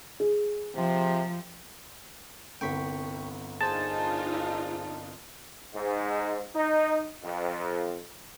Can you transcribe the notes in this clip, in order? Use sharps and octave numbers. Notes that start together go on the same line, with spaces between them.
G#4
C3 F3
G1 C2 G5 C#6 B6
D4 D#4 F4 G#4 C5 G#5 A5
G#2
D#4
F2